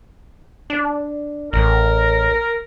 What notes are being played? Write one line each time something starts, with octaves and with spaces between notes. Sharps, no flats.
D4
A1 A#4